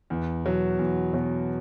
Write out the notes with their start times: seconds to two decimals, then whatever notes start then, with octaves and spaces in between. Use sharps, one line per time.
0.10 E2
0.45 B2 F#3
0.79 E2
1.13 B2 F#3